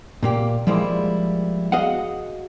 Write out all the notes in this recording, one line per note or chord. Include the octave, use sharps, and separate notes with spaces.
A#2 A#3 G4
F3 G3 G#3 A#3 E4
F#4 G#4 D#5 F5 F#5